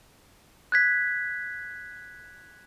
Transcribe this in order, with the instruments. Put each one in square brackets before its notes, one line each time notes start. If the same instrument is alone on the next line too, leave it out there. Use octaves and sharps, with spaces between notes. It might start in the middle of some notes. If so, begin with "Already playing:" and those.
[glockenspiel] F#6 G#6 B6